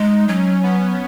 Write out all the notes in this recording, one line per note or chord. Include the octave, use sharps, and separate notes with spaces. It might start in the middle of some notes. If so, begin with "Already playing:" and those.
Already playing: G#3 D#4
F#3 C#4
B3